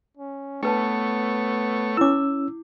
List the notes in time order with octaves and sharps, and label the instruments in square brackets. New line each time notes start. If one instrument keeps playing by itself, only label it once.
[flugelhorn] C#4
[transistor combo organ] A3 C#5 [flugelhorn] B3 [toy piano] D4 B4 A5
[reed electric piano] C#4 E6 [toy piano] E4 D6